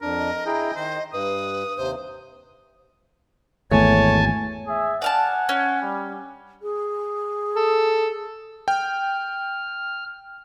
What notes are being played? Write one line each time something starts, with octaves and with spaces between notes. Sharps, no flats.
F2 D4 A#4
D#5
E4 G#4 G5 A#5
D#3 C5
G2 B4 D#6
D#2 C3 C5
G#1 E2 A3 C#5 G#5 A5
G#4 E5
D5 F5 F#5 G#5 A5
C#4
G3
G#4
A4
G5 F6